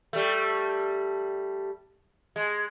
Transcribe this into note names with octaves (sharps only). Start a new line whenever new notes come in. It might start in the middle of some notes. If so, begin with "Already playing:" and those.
G3 A3
G#3